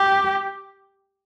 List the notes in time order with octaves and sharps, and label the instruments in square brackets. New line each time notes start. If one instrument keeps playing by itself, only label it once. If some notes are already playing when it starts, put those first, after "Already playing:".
Already playing: [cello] G4